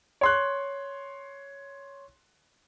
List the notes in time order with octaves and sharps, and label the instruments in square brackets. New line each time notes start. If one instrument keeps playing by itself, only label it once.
[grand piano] C#5 C6 F#6